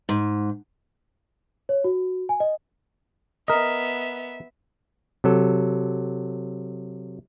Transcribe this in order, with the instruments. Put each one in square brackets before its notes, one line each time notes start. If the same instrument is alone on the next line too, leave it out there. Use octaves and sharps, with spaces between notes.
[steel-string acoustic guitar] G#2
[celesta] C#5
F#4
G#5
D#5
[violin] B3 E5 [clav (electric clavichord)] A#4 D#5
[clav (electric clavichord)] C3 F#3 A4